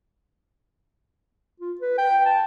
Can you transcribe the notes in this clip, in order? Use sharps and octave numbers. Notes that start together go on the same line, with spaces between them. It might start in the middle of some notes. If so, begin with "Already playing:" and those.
F4
B4
G5
A5